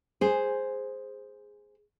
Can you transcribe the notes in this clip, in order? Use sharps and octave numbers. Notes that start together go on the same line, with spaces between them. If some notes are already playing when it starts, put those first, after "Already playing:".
G#4 C5